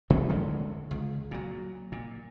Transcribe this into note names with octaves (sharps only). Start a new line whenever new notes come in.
G#2 B2 D#3 F#3
D2 D3 G#3 C#4
C#2
A#2 F#3
A#2